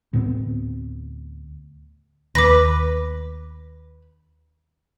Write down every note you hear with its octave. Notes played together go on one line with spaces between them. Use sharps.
D2 A2 B3 C4
D#2 B4 D6 A#6